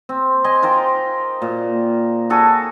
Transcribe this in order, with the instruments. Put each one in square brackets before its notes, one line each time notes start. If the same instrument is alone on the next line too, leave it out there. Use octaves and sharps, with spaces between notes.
[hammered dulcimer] C4
D#5 G#5 C6
F4 A#4 C5 G5
A#2
F#4 G#4 A4 G#5